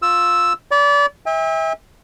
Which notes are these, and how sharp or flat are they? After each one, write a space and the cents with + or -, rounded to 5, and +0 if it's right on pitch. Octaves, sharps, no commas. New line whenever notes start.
F4 +10 E6 +0
D5 -30 B5 +0
E5 -30 G5 +45